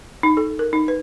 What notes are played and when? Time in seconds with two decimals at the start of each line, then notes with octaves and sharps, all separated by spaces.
0.23 D#4
0.37 A4
0.59 A#4
0.73 D#4
0.88 B4